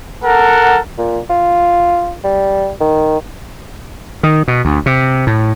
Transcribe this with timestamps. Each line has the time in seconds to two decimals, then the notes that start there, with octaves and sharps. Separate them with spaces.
0.24 A4 A#4 F#5
0.98 A#2
1.29 F4
2.24 G3
2.80 D#3
4.23 D#3
4.48 B2
4.65 D2
4.86 C3
5.27 A2